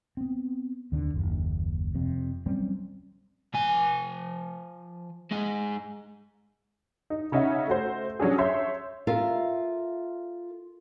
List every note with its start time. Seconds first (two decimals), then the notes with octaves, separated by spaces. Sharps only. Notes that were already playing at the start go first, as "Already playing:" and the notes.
0.17 B3 C4
0.92 D#2 D3 C4 D4
1.14 F#1 D#2
1.95 F2 C3
2.46 F#3 G3 C4 C#4
3.55 F3 G#5
5.31 G#3 D#4
7.10 D#4
7.32 C#3 C#4 D#4 E5 F#5
7.67 A3 F#4 C5
8.20 F#3 C#4 D4 G#4
8.38 C#5 E5 C6 G6
9.07 F4 A4 A#4 E5 F5